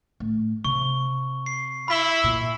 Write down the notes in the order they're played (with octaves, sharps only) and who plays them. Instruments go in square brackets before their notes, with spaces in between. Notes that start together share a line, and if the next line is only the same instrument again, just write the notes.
[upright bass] A2
[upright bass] C3 [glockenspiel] C#6
[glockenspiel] C7
[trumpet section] E4 E5 [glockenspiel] B5 B6 G7
[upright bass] A#2